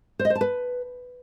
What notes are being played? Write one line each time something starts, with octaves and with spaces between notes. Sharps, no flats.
C5
D#5
C5
A5
B4